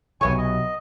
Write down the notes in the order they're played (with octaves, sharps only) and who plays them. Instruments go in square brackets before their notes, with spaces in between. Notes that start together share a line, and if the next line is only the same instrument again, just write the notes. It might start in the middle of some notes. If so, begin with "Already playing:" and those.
[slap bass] B1 C3 [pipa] F#3 B3 C#6 [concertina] C#5 G#5
[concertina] D#5